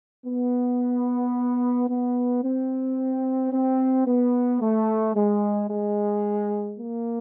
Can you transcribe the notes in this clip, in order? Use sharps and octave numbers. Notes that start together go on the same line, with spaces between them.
B3
B3
C4
C4
B3
A3
G#3
G#3
A#3